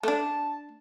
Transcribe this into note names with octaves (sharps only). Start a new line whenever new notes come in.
A3 D4 A5